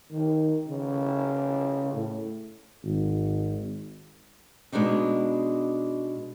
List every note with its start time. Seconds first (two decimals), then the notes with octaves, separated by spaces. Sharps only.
0.11 D#3
0.69 C#3
1.93 A2
2.83 G#1
4.72 B2 G#3 B3 D4 D#4